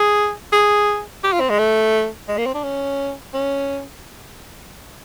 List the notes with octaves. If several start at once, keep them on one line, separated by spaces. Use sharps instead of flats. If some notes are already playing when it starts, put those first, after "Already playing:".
Already playing: G#4
G#4
G4
F4
C4
G#3
A3
G#3
A#3
C4
D4
C#4
C#4